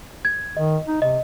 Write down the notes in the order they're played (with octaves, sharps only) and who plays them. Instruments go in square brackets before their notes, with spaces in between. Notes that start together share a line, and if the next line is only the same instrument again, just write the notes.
[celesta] G#6
[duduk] D#3 [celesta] D#5
[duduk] D#4
[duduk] C3 [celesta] D#5